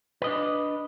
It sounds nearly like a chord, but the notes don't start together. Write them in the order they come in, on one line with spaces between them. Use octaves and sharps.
B4 D#5 D4